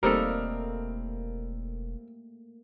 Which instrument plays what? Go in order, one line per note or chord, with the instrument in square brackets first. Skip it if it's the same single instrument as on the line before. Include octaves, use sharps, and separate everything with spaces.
[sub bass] E1 [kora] G3 D#4 A4 [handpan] A3 A#3 [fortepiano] C4 A#4